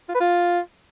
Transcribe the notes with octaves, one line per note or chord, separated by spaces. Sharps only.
F4
B4
F4